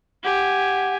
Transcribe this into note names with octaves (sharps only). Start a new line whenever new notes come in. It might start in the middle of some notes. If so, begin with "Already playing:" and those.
G4 F#5 G#5